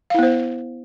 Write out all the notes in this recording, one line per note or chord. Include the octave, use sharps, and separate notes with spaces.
B3 E4 C5 F5